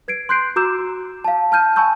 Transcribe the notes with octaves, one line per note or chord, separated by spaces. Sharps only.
B4 G#6 C7 D7
C6 F#6 G6 C7 D7
F#4 A#5 D6 E6 G6 E7
F5 A5
A5 F6 G6 D#7
G#5 A5 B5 C#6 E6 G6